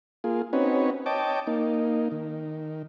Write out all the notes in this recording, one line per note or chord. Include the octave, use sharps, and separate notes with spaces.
A#3 F4 G#4
C4 C#4 D#4 F#4 B4 C#5
C#5 D#5 G5 A5 D6
A#3 D#4
D#3